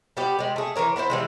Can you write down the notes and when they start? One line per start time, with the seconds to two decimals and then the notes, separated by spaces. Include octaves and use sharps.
0.17 G3 B3 G4
0.39 G3 G#3
0.56 A3 G#4
0.76 E3 G#3 A#4 C#5
0.96 B3 E4 B4 C5
1.10 E3 G3 G#3